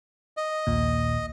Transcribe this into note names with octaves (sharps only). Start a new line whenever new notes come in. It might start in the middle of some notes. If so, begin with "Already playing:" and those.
D#5
A#1 D#2 A#2